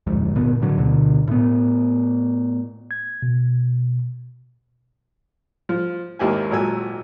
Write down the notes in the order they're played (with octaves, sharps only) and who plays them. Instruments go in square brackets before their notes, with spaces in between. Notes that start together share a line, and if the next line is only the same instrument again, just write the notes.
[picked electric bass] D1 F2 G#2
G1 A#2 B3
A2 D3 F#3
D2 B2 D3
A2 B3
[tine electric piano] G#6
B2
[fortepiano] F3
G#1 D#2 A#3 E4 G4 G#5
G#1 A#2 F#3 A4 G#5 E6